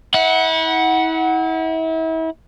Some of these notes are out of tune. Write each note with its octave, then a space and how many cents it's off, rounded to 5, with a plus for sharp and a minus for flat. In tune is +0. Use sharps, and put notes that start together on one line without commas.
E4 -35 F#5 +5